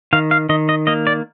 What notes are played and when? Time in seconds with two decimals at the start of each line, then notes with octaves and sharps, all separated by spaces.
0.13 D#3 F5
0.31 F5
0.49 D#3 D#5
0.69 D#5
0.87 A#3 D#5
1.07 D5